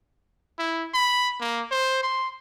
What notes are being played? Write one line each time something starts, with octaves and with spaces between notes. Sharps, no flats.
E4
B5
A#3
C5
C6